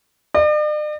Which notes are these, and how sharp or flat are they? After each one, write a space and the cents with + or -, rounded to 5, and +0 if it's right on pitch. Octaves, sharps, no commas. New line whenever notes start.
D5 +45